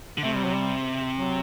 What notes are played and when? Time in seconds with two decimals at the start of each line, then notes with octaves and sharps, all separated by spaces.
0.18 D3
0.24 C3 A3
0.35 G3
0.45 F#3
0.55 G3
1.16 F#3